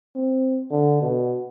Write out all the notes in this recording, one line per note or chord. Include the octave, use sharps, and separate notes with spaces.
C4
D3
B2